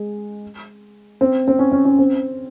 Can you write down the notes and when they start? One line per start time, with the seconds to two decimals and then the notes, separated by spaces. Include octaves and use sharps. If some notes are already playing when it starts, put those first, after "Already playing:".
Already playing: G#3
1.21 C4
1.48 C4
1.59 C#4
1.72 C#4
1.85 C#4
1.99 C4